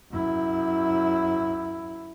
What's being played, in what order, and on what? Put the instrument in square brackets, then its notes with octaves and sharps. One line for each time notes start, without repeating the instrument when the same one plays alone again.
[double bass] F#2 E4